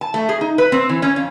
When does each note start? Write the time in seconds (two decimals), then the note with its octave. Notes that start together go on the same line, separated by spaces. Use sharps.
0.01 A5
0.14 A3
0.29 G#4
0.41 D#4
0.58 B4
0.72 C4
0.89 E3
1.02 C#4
1.16 F2